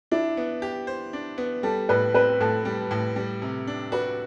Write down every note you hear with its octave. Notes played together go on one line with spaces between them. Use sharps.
D4 E4
B3
G4
C5
D4
B3
G3 A4
A2 B4
C4 B4
A2 A4
G3
A2
G3
C3
D4
F#4 B4